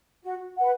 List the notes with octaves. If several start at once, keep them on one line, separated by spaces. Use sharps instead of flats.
F#4
B4 F#5